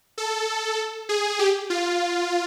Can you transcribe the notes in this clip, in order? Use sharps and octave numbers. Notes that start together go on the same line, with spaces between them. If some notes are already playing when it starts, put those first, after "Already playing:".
A4
G#4
G4
F4